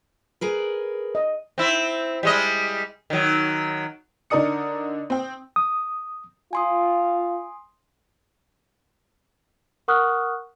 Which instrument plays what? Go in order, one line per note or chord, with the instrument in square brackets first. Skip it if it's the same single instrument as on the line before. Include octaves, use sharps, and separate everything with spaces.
[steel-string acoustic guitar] G#4 A#4 B4
[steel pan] D#5
[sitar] C4 E4
G3 G#3 D#5
D#3 F#3
[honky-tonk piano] D3 D#4 A#4 D5 D#6 C#7
C4 G5
[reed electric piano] D#6
[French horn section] F4 [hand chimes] G#5 C6 D#6
[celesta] A#4 F#5 C#6 D#6 F6 F#6